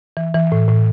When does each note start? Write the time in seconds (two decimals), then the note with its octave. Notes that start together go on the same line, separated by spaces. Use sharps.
0.17 E3
0.34 E3
0.52 A2
0.69 A2